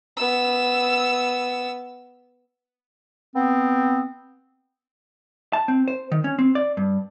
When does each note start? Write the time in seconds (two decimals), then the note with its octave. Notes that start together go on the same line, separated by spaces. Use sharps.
0.17 B3 E6
3.35 B3 C4
5.53 A5
5.68 C4
5.88 C5
6.12 D#3
6.24 C#4
6.39 C4
6.55 D5
6.77 G2